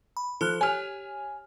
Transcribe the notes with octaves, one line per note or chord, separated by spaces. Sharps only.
B5
F3 A4 F6 F#6
G4 C#5 G#5 F6